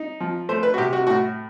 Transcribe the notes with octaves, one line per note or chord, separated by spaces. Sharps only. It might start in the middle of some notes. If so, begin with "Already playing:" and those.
Already playing: D#4
F3
A3 C5
B4
F#4
C3 G4
F#4
A2 F#4